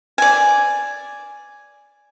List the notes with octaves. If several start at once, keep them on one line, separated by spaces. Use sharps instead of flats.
D5 G#5